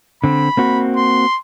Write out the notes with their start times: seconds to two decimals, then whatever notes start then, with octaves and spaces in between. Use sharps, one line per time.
0.24 D3 C4 B5
0.57 A#3 C4 F#4
0.97 C6